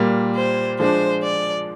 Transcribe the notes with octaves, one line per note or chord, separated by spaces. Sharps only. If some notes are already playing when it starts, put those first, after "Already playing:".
Already playing: A#2 G3 A#3
C5
F3 G#3 D4 C5
D5